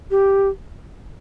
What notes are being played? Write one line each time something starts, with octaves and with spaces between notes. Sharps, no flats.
G4